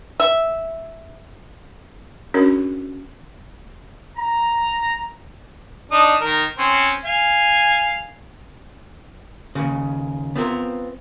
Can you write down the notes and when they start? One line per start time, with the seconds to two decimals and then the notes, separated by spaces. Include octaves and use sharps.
0.20 E5
2.34 C#4 D4 F#4 G#4 A#4 C#5
4.17 A#5
5.91 D4 D#4 D#6
6.20 D#3 A#4
6.58 C4 C#4
7.05 F5 G#5
9.55 D#2 A#2 C#3
10.36 B3 C4 F4 A#4